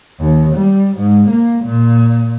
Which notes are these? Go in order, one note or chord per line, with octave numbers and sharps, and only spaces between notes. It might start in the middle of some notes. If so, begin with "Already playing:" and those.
D#2
G3
G#2
A#3
A#2